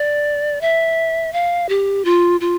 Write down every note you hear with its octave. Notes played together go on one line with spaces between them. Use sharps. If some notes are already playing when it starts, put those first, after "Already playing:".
Already playing: D5
E5
F5
G4
F4
F4